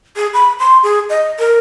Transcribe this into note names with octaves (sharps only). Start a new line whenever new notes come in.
G#4
B5
C6
G#4
D#5
A#4